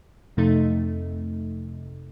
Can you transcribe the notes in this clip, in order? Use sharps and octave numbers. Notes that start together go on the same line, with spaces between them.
F2 C3 A3 D#4